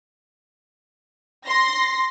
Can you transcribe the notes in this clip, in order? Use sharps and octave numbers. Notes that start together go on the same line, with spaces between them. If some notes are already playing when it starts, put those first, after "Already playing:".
C6 A#6